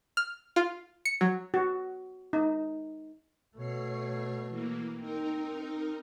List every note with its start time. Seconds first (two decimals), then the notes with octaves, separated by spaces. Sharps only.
0.17 F6
0.56 F4
1.05 C#7
1.21 F#3
1.54 F#4
2.33 D#4
3.57 B2 A3 C#5 C7
4.49 E3 A#3
5.00 C4 D#4 A#4